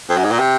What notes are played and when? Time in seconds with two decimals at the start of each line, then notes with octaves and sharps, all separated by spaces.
0.09 F2
0.17 F#2
0.24 G#2
0.31 A#2
0.39 C3